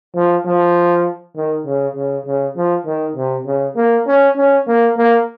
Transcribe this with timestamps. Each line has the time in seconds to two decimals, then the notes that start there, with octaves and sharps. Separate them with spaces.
0.15 F3
0.45 F3
1.36 D#3
1.66 C#3
1.96 C#3
2.26 C#3
2.56 F3
2.86 D#3
3.16 C3
3.46 C#3
3.76 A#3
4.06 C#4
4.37 C#4
4.67 A#3
4.97 A#3